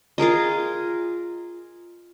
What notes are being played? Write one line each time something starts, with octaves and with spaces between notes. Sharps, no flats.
F4 G#4 A#4 D#5